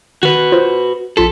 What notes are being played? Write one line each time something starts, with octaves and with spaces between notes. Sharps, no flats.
D#3 F#4 B4
F4 C5
A#1 F4 A4 B6